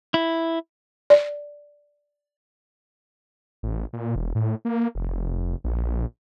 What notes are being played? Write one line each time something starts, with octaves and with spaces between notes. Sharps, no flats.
E4
D5
A1
A#2
E1
A2
A#3
F1
A#1